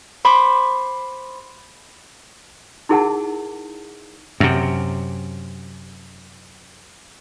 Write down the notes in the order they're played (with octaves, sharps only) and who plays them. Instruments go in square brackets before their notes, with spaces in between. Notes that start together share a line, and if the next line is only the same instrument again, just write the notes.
[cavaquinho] C5 B5 C#6 D6
[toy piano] D#4 E4 G#4 A#4 F#5 A5
[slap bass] F#2 C3